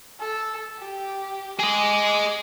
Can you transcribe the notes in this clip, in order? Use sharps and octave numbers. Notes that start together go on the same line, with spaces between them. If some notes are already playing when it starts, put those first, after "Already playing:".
A4
G4
G#4 D#5 D6